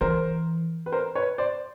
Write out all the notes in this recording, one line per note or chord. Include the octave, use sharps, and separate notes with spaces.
E3 A#4 C5
B4
A#4 C5
B4 C#5
C5 D5